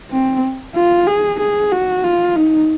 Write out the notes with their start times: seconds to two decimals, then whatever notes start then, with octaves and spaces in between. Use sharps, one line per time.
0.11 C4
0.75 F4
1.07 G#4
1.40 G#4
1.72 F#4
2.04 F4
2.37 D#4